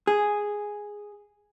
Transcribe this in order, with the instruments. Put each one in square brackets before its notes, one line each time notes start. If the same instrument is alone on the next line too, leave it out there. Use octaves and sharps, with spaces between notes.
[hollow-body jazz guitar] G#4